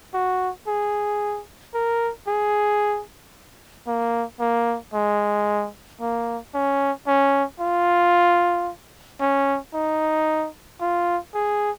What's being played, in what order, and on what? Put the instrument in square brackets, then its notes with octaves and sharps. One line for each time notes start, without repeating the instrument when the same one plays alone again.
[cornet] F#4
G#4
A#4
G#4
A#3
A#3
G#3
A#3
C#4
C#4
F4
C#4
D#4
F4
G#4